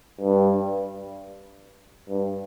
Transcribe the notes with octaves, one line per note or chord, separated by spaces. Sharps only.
G2
G2